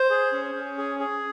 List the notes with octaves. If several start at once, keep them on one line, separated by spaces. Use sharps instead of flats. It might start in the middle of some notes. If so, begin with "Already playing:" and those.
Already playing: C5
G#4
C#4
C#4
G#4
G#4